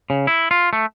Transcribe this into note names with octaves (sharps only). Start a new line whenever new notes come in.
C#3
E4
F4
A3